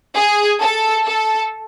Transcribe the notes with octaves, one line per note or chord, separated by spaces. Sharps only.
G#4
A4
A4